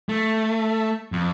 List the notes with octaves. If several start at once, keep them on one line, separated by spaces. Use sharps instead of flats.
A3
F2